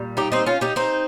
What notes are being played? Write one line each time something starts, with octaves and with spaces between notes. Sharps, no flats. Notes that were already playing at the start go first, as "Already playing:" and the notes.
Already playing: A#2 G3
D#4 G4
C4 D#4
C#4 F4
D#4 G4
C4 D#4